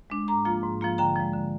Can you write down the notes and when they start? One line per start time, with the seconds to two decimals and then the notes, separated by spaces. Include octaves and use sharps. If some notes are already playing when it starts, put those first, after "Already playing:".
0.10 G#3 D4
0.28 G#2 A#5 D6
0.45 F3 A#3 F4
0.63 G#2
0.81 F3 A#3 F4
0.98 D3 G5 A#5
1.16 F3 G#3
1.34 D3